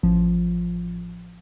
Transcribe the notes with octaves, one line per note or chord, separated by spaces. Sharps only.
A1 F3